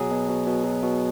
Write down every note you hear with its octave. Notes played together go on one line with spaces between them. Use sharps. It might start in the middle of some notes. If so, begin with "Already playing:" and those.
Already playing: B2 F#3 G#4
B2
B2
B2
F#3
B2